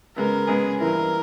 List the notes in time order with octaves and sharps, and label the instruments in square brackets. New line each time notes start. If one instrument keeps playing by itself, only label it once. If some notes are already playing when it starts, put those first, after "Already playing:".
[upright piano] C#3 G#3 B3 [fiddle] A#4
[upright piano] C#3 G#3 B3 [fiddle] G#4
[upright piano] G2 E3 A#3 E4 [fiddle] A#4